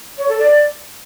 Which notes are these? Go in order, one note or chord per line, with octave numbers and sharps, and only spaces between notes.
C#5
A4
D5